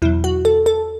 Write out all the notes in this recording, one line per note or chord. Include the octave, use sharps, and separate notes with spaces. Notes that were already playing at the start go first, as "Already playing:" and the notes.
E2 B2 F#3 E4
F#4
A4
A4